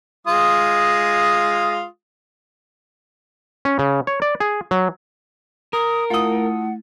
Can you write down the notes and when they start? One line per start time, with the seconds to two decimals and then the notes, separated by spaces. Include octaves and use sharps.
0.27 G#3 F4 D#6
3.65 C#4
3.79 C#3
4.07 C#5
4.22 D5
4.40 G#4
4.71 F#3
5.73 A#4 D#6
6.10 A3 E4 F4 F#5 D#6